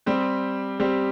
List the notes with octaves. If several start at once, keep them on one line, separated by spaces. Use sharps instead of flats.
G3 C4 G4
G3 C4 G4